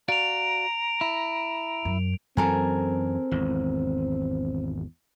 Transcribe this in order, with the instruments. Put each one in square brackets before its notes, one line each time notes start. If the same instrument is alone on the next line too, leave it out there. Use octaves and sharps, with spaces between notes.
[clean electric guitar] F#4 D5 F5 [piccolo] A#5 [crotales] D7 F7
[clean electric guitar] E4
[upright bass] F#2
[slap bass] F#2 E3 F#3 [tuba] C4 [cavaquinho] A4 A#4 G#5
[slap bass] G#1 E2